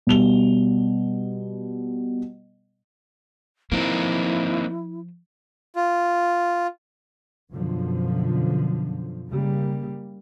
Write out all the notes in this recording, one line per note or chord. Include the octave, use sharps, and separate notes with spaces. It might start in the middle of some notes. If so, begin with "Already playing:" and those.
B2 G3 F7 G7
F3 A#3 C4 D#4 E4
F4
F#2 B2 D3 F3
C#3 G3 A#3